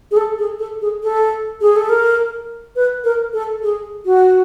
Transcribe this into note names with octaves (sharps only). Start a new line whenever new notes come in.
G#4
A4
G#4
A4
G#4
A4
G#4
A4
A#4
B4
A#4
A4
G#4
F#4